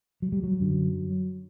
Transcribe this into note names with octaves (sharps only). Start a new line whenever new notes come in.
F#3
G3
F#3
F#2 D3